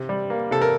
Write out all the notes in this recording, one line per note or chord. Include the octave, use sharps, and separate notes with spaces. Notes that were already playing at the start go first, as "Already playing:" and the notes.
Already playing: C3
G3
A#3
C3 A4
A#4